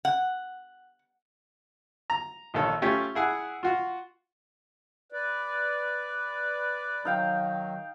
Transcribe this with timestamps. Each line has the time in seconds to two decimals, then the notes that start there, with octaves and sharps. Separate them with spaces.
0.05 F#5
2.10 A#5
2.54 A#1 D#3 A4 C#5
2.82 A3 C#4 F4 G4 C#5
3.15 E4 G#4 F#5
3.63 F4 F#4
5.12 B4 D5
7.05 D#3 F#3 D#4 F5 G5